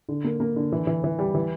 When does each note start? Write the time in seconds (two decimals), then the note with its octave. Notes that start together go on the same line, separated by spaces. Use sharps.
0.09 D3
0.24 A#3
0.40 A#3
0.56 D3
0.72 E3
0.87 E3
1.04 E3
1.19 G3
1.35 E3